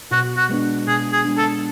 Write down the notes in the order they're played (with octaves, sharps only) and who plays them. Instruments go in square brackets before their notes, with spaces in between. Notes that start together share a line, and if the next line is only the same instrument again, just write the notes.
[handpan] B2 [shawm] F#4
[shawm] F#4
[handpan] G#3 B3 D4
[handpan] B2 [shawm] G#4
[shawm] G#4
[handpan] G#3 B3 D4
[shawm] A4